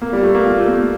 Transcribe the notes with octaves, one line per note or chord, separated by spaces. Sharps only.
A#3
G3
A3
A#3
F4
A3
A#3